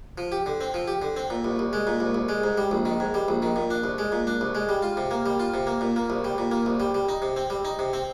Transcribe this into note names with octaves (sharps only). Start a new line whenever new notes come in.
F3
G4
D3
C4
F3
G4
D3
C4
A#2
C2
C2
G#3
A#2
C2
C2
G#3
G#2
G3
A#1
D#3
G#2
G3
A#1
D#3
A#2
D4
C2
G#3
A#2
D4
C2
G#3
G3
F4
C3
A#3
G3
F4
C3
A#3
A#2
A#3
C2
G3
A#2
A#3
C2
G3
G3
D#4
C3
C4
G3
D#4
C3
C4